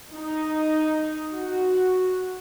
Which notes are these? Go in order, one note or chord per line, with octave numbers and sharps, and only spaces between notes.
D#4
F#4